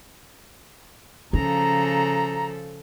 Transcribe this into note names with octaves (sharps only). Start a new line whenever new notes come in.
C#3 F3 C#4 A4 A#5